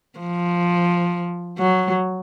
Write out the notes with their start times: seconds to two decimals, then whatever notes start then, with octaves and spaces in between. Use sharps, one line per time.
0.19 F3
1.59 F#3